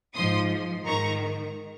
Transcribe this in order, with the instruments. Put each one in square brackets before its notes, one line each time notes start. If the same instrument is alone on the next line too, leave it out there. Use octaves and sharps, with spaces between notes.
[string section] G#2 F3 C6 D#6
G#2 D#3 A#5 C#6